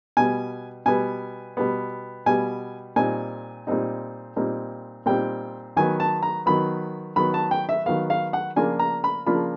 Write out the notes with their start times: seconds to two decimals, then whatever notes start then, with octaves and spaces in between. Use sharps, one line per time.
0.17 B2 G3 B3 G#5
0.86 B2 G3 B3 G#5
1.57 B2 G3 B3
2.26 B2 G3 B3 G#5
2.96 A#2 G3 C4 D#4 G#5
3.67 A#2 G3 C4 D#4
4.36 A#2 G3 C4 D#4
5.06 A#2 G3 C4 D#4 G5
5.77 D#3 F#3 B3 G#5
6.00 A5
6.23 A#5
6.46 D#3 F#3 B3 B5
7.16 D#3 F#3 B3 B5
7.34 A5
7.51 G5
7.69 E5
7.86 D#3 F#3 B3 F5
8.10 F5
8.33 F#5
8.56 C#3 F3 A#3 D4 F4 G#5
8.79 A#5
9.04 B5
9.26 C#3 F3 A#3 D4 F4 B5